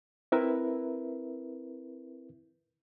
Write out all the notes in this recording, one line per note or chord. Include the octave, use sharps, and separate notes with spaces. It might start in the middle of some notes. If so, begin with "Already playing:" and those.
C4 E4 A#4 B4 E5